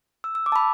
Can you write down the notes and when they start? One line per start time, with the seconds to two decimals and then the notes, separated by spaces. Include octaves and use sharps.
0.24 E6
0.35 E6
0.46 D6
0.52 A5
0.56 B5